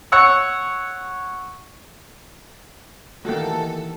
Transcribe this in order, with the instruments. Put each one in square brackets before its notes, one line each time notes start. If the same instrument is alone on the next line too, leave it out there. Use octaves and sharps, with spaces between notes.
[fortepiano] C#5 F#5 E6
[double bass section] D#3 E3 [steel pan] A3 A#3 [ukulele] F#4 G4 [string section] A4